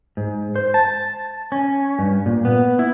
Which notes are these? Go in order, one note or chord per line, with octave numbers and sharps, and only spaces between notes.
G#2
C5
A5
C#4
G2
A#2
B3
E4